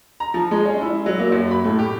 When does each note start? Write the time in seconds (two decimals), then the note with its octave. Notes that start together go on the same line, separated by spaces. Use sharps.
0.20 A#5
0.34 F3
0.51 G#3
0.65 C#4
0.82 E4
1.06 F#3
1.19 A#3
1.32 F#2
1.51 B5
1.64 A2
1.79 G4